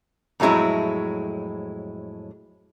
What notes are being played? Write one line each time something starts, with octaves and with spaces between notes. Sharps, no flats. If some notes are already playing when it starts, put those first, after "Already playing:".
F2 A2 F#3 G#3 E4